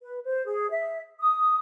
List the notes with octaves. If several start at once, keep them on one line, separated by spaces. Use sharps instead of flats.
B4
C5
G#4
E5
D#6